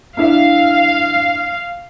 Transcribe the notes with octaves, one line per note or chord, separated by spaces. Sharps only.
D4 E4 E5 F5